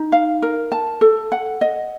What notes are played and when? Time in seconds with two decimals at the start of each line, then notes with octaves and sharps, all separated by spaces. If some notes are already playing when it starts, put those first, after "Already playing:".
Already playing: D#4
0.12 F5
0.42 A#4
0.72 A5
1.01 A4
1.32 F#5
1.61 D#5